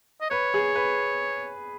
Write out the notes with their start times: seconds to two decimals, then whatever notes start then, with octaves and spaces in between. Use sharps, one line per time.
0.21 D#5
0.31 B4 C#5
0.54 G#4
0.76 B4